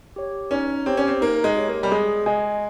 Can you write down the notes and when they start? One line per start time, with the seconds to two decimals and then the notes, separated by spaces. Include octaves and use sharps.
0.16 G4 C#5
0.51 C#4 D#4
0.86 C4 G4 C#5
0.97 C#4
1.07 C4
1.21 A#3 D#4
1.44 G#3
1.56 G4 C#5
1.68 A#3
1.83 G3
1.91 G#3 G#4
2.26 G#3 D#5 G#5